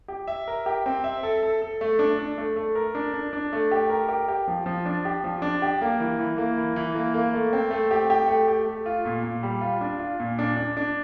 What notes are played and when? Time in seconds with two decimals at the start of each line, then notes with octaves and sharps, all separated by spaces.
0.08 G4
0.27 E5
0.48 A#4
0.66 G4
0.86 C4
1.04 E5
1.23 A4
1.43 A4
1.62 A4
1.81 A3
1.99 D4
2.19 D4
2.38 A3
2.56 A3
2.75 A#4
2.95 D4
3.14 D4
3.33 D4
3.53 A3
3.71 G4
3.90 A#4
4.09 G4
4.28 G4
4.48 F3
4.66 F3
4.86 D4
5.05 G4
5.24 F3
5.42 D4
5.62 G4
5.81 A#3
6.00 E3
6.19 E3
6.38 A#3
6.57 E3
6.76 E3
6.95 A#3
7.14 A#3
7.34 A3
7.53 C4
7.71 A3
7.91 G4
8.10 G4
8.28 A3
8.48 G4
8.66 A3
8.86 F4
9.05 A#2
9.24 A#2
9.43 G3
9.61 F4
9.81 D4
9.99 F4
10.20 A#2
10.39 D4
10.56 D4
10.77 D4